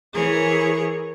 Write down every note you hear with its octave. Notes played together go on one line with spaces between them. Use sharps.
E3 G#4 A#4 C#5